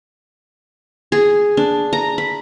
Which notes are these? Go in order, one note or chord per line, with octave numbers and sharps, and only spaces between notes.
G#4
D4
A#5
B5